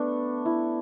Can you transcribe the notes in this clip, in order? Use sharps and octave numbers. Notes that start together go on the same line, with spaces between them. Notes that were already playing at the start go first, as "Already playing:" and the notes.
Already playing: A3 B3 D4
E4